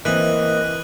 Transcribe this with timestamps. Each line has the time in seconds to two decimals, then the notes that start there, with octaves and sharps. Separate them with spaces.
0.05 E3 A#3 C4 D#5 F#6 D#7 F#7